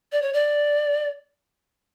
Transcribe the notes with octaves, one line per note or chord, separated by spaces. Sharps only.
D5
C#5
D5